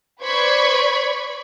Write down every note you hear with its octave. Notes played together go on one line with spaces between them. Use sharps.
B4 C5 D5 B5 C#6 G#6